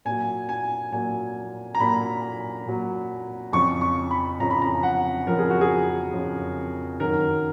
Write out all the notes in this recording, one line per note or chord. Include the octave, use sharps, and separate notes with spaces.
A#2 F#3 G#5
G#5
A#2 F#3 G#5
A#5
A#2 F#3 B5
A#2 F#3
F2 C#3 F3 C#6
C#6
B5
F2 C#3 F3 A#5
B5
A#5
F#5
F2 C#3 F3 A#4
G#4
F#4
G#4
F2 C#3 F3
F#2 D#3 F#3 A#4